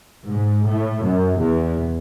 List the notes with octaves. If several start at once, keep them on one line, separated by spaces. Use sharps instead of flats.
G#2
A2
F#2
E2